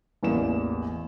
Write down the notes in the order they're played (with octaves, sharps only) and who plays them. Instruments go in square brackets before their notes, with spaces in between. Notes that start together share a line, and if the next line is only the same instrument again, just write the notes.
[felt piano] A1 E2 A#3 E7